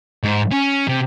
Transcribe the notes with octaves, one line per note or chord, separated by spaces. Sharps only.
G#2
C#4
C3